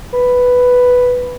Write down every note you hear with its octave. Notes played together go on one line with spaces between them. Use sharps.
B4